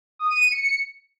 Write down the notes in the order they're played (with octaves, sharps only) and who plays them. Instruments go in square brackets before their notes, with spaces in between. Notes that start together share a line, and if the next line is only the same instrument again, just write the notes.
[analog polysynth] D#6
D#7
D#7
C#7